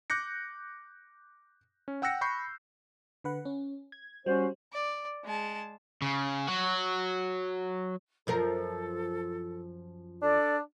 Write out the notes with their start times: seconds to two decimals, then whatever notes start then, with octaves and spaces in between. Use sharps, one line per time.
0.10 D6 F#6 G6 A#6 C#7
1.88 C#4
2.02 F#5 G5 E6 F#6 A#6 C#7
2.21 B5 C#6 G6 C7
3.24 D3 B4 F#5
3.45 C#4
3.92 G#6
4.26 G3 C#4 F#4 C5
4.73 D5
5.24 G#3 A5
6.02 C#3
6.48 F#3 F#4
8.27 F#2 F3 A4 A#4
10.22 D4 A4 D5